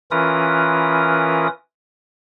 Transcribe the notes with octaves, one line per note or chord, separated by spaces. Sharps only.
E3 C#4 F4 A#4 B4 D#6